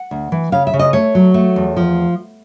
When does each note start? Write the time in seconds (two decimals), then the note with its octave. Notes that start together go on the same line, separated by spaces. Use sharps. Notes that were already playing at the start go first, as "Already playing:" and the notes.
Already playing: F#5
0.11 D2
0.32 E3
0.52 C#3 F5
0.67 E5
0.74 C#3
0.79 D#5
0.93 A3 C#5
1.15 F#3
1.34 A3
1.56 E2
1.77 F3